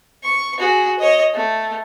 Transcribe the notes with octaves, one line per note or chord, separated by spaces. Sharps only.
C#6
F#4 G#4
C#5 D#5
A3